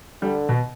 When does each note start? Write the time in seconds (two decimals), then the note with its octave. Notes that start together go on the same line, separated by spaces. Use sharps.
0.22 D3 G3
0.49 B2